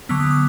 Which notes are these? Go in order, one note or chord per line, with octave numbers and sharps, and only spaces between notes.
D3 F#3 B3 E6
D#6
D6